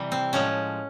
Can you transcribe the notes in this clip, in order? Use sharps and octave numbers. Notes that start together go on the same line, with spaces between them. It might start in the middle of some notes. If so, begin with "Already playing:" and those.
Already playing: C3 E3 G3
C4
A2 F3 G#3 C#4